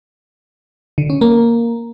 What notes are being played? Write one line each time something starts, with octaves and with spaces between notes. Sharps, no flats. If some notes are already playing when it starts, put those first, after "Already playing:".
D3
C#4
A#3